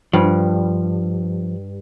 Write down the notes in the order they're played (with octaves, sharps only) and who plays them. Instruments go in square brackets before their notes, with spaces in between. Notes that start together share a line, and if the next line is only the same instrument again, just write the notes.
[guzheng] G2 [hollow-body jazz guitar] F3